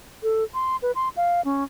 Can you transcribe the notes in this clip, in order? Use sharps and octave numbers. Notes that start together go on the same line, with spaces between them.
A4
C6
B4
C6
F5
C#4